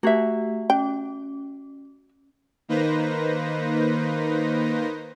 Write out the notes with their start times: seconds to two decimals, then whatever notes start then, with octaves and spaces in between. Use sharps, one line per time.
0.03 A3 F#4 G4 E5
0.70 C#4 G5
2.68 D#3 A#3 D#4 B4 C5 A#6